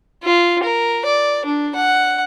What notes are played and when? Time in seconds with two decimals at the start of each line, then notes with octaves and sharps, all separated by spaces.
0.24 F4
0.63 A#4
1.06 D5
1.45 D4
1.75 F#5